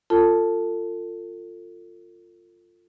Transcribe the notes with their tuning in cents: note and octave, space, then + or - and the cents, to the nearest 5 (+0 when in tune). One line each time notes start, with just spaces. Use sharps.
F4 +0 A4 +35 A5 +0